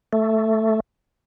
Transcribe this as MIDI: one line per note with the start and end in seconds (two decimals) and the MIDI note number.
0.13 0.80 57